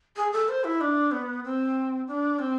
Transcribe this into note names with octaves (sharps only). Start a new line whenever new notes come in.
G#4
A4
C5
E4
D4
B3
C4
D4
C4